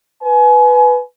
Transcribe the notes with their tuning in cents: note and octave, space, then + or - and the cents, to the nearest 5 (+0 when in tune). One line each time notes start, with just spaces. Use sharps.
B4 +0 G#5 +30